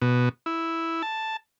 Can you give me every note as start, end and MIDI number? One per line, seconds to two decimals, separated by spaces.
0.02 0.29 47
0.46 1.02 64
1.03 1.37 81